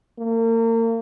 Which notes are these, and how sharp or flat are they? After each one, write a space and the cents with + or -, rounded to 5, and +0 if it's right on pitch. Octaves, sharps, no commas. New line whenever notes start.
A#3 -35